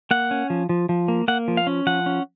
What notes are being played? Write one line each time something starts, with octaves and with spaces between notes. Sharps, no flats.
A#3 F#5
C#4
F3
F3
F3
A#3
A#3 F#5
F3
F5
C#4
F3 F#5
C#4